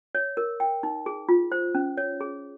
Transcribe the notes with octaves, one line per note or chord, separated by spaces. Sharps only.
C#5
A#4
G5
D#4
G#4
F4
C5
C#4
C#5
G#4